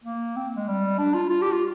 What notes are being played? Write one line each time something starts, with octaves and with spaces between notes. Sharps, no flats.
A#3
C4
G#3
G3
D4
F4
F4
G4
F4